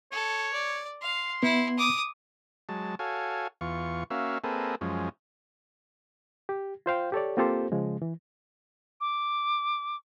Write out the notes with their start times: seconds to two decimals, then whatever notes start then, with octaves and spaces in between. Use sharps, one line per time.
0.12 A4 C#5
0.53 D5
1.02 F5 C6
1.43 B3 E4
1.78 D6 D#6
2.69 F#3 G#3 A5
2.99 F#4 A4 C#5 F5 G#5
3.61 E2 F4 C#6
4.10 A#3 C#4 F#4 E5 F5
4.44 A#3 C4 G#4 A4 B4 D#5
4.81 F#2 F3 G#3 C#4
6.49 G4
6.86 F4 C5 F5 G5
7.12 G4 A4 C#5 D5
7.37 A#3 C4 F4 G4 A4 C5
7.72 C#3 F3 G#3
8.02 E3
9.01 D6